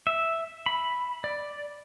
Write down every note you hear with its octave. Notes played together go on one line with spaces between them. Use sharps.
E5
B5
D5